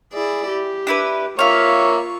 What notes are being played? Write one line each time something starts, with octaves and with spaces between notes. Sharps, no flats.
E4 G#4 D5
G4
D4 E4 B4
A#3 F4 C#5 E5 F5 C#6